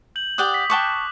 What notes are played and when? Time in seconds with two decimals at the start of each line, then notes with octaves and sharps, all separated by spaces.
0.16 G6 F#7
0.38 G4 D5 F#5 D#6
0.54 B6
0.70 G5 A5 C#6 D6 F#6